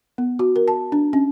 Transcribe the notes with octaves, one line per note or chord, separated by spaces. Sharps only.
B3
F#4
A#4
A5
D4
C#4